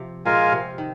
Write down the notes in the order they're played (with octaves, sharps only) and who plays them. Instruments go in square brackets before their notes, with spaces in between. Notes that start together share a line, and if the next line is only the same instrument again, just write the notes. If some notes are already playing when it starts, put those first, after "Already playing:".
Already playing: [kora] C3 F3
[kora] A#2 [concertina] G#3 F4 A#4 F5 G#5
[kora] C3
D#3